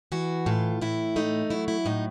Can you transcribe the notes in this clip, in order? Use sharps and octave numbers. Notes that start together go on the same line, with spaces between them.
E3 F#4
A2 F4
A2 E4
A3 D#4
F#3 E4
E4
A2 D#4